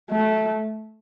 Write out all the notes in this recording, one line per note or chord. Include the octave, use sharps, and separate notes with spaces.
A3